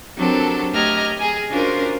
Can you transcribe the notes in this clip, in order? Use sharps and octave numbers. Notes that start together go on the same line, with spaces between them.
F#3 C4 D4 G4 A4 A#4
A3 G4 D#5 A#5 F6 G#6
G#4 G#5
C#4 D4 F4 F#4 A#4 C5